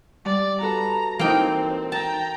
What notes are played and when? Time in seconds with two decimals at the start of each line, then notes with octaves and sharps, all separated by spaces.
0.25 G3 D5
0.61 F#4 A4 B4 A#5
1.19 E3 A#3 C4 D#4 G5
1.92 G5 A5 A#5